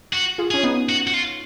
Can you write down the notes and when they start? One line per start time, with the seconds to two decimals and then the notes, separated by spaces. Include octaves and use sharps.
0.13 F#4
0.38 F4 G#4
0.51 C#4 G#4
0.63 B3 D#4
0.89 F#4
1.07 F#4
1.14 F4